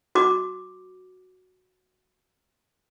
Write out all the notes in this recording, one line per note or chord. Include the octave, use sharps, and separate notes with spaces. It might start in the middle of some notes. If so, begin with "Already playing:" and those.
F#4 D6